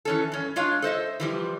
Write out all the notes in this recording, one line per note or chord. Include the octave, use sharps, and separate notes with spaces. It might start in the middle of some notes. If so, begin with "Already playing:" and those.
E3 C#4 A4
G2 C#4
G#3 D4 F4 C#5 F5
A4 C5 D#5 E5
E3 F3 G3